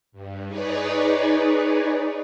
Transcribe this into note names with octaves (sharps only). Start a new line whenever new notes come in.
G2
D#4 G#4 B4 C#5 D5